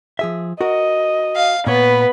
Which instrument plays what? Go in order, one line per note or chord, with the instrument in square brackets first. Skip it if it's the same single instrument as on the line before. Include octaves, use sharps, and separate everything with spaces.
[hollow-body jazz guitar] F3 G#4 E5
[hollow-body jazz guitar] F#4 A#4 [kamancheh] D#5
[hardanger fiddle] F5
[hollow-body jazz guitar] A#2 C#5 [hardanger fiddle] B3 [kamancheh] B4 B5